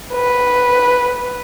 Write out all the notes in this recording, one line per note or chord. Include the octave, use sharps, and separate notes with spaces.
B4